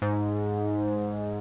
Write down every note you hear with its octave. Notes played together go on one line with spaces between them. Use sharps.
G#2